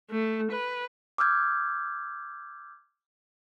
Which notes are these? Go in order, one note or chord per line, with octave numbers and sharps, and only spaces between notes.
A3
B4
D6 E6 F6 G6 G#6